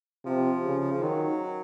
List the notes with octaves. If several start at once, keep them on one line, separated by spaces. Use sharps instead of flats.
C3 F3
C#3
D#3 F#3